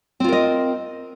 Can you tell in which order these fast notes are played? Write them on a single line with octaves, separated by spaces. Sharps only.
C4 F4 A#4 D#5